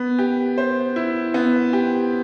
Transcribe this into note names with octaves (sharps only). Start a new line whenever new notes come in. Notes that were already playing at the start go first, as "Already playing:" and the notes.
Already playing: B3
G4
C5
E4
B3
G4